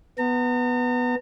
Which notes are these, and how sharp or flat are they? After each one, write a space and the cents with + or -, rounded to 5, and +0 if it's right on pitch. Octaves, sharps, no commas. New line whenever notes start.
B3 +0 A#5 -45